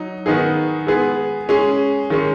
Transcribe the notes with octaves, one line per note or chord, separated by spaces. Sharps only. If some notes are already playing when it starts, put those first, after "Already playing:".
Already playing: F#3 D#4
D#3 B3 D#4 G#4
G#3 B3 G#4
G#3 C#4 G#4
D#3 G#3 C#4